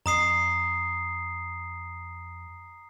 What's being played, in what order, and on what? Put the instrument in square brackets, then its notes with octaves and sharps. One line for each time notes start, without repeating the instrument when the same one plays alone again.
[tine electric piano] F2 [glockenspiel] A#5 D#6 C7